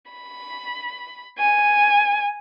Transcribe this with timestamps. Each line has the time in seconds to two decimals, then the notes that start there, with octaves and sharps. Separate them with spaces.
0.11 B5
1.38 G#5